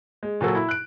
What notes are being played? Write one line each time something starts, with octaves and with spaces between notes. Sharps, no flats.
G#3
A#2 F#3 F#4 A4
E4
F#6 D7